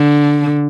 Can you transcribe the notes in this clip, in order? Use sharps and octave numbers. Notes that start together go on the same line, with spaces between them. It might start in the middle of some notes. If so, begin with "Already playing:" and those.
Already playing: D3